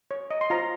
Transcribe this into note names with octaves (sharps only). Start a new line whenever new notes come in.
C#5
D#5
C6
F4 C5 A#5